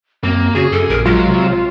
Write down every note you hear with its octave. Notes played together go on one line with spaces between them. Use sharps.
F#2 A#3 C4
C#3 F#4 G#4
F#2 A4
A#1 A#4
F#3 G#3 F4
C3